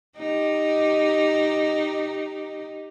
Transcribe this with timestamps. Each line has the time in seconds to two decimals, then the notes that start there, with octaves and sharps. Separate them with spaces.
0.17 D#4 G4